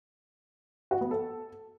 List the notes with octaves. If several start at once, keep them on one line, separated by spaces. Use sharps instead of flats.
F#4
B3
A4